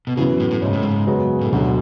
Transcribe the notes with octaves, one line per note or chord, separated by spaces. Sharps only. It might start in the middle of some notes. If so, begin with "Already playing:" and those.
B2
F#2 C#3 E3 B3 F#4
A2
A2
G#2 C#3 G#3 C#4
A2
G#2
F#2 C#3 G#3 B3 F#4
A2
D2 B2 D3 F#3